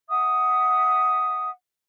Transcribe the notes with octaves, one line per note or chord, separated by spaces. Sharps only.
E5 F#5 D#6